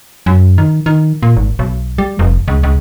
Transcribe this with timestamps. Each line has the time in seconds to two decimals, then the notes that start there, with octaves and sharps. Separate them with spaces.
0.26 F#2
0.58 D#3
0.86 D#3
1.23 A#2
1.37 G#1
1.59 B1
1.98 G3
2.19 F1
2.48 C#2
2.63 C#2